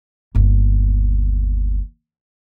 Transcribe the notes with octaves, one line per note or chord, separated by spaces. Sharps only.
G1 D#2